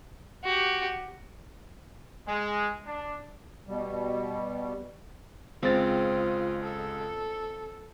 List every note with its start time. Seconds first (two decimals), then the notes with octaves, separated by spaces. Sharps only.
0.44 F#4 G4
2.27 G#3
2.85 D4
3.67 B2 G3
5.63 C#2 G#3 C4 F4 A6
6.64 A4